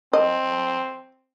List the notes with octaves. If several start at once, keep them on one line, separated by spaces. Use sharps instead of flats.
C4 D#5